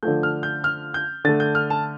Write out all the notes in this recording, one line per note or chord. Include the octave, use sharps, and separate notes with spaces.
D3 F3 A3 G6
F6
G6
F6
G6
D3 A3 A6
G6
F6
A5